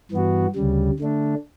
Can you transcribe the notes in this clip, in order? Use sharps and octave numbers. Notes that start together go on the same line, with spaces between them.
G2 E3 B3 F#4
D2 C#3 G3
D3 A3 D4